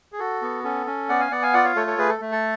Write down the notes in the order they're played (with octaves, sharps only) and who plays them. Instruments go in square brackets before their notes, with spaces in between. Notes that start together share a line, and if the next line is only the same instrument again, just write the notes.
[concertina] G#4
F#4 A4
B3
C#4 A4
C#4
B3 D5 F#5
F5 G#5
B3 D5 F#5
F5 G#5
F4 D5 F#5
C#5 F5
A3 A4 C#5
A4 C#5
A3 G#4 B4
A4
A3
A4